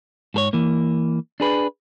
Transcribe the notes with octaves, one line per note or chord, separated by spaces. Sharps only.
G#2 A4 C#5
E3 A#3
D4 G#4 B4